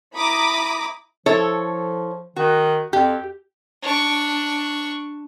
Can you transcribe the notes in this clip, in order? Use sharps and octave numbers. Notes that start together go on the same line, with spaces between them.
E4 A#5 B5 D6 D#6
F3 E4 A4 C#5
D#3 F#4
F2 G4
D4 C#6